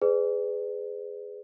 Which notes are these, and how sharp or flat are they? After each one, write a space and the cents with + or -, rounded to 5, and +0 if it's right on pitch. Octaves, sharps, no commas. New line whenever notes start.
G#4 +0 B4 +25 D5 +0